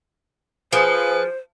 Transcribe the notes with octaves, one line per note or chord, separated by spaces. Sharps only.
F3 G#4 B4 C5